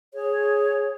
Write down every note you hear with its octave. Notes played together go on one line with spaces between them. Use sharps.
G#4 C#5